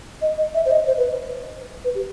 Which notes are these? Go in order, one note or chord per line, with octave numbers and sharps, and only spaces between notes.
D#5
D#5
E5
C5
D#5
C5
B4
B4
G4